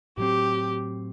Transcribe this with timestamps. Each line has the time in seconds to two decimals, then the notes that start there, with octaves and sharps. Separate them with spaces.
0.18 A2 F#3 C4 G4